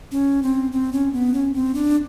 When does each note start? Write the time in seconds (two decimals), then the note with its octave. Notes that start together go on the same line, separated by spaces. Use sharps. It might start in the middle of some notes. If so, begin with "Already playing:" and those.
0.12 C#4
0.43 C4
0.72 C4
0.93 C#4
1.13 B3
1.34 C#4
1.54 C4
1.75 D4